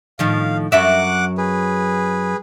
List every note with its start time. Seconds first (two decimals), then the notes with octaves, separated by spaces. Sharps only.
0.19 A2 D#3 F3 F5
0.72 F#2 F#3 E5 F#5 D6 F#6
1.38 G#4 B4